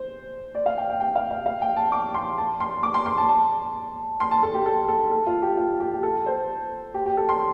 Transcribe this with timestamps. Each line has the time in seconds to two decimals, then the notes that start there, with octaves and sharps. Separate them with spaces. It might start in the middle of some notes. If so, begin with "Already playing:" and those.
Already playing: C5
0.55 D5
0.66 F5
0.78 G5
0.90 G5
1.00 G5
1.15 F5
1.31 F5
1.46 F5
1.62 G5
1.76 A5
1.92 D6
2.14 C6
2.38 A5
2.60 C6
2.83 D6
2.94 C6
3.06 C6
3.18 A5
3.29 A5
4.20 C6
4.31 A5
4.43 A4
4.54 G4
4.66 A4
4.88 A4
5.12 A4
5.27 F4
5.42 G4
5.57 F4
5.80 G4
5.94 G4
6.03 A4
6.26 C5
6.94 G4
7.06 G4
7.17 A4
7.29 C6